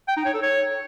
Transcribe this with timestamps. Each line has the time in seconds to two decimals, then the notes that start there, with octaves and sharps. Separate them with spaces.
0.08 G5
0.17 D#4
0.25 C#5
0.34 A4
0.43 C#5